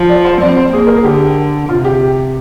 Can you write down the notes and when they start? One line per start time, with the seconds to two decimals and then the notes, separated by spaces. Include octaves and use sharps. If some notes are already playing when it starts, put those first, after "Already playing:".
Already playing: F3
0.09 D5
0.25 C5
0.41 C4 D5
0.57 C5
0.72 A#3 G#4
0.87 A#4
0.96 G#4
1.04 D3 G4
1.69 C3 F4
1.85 G4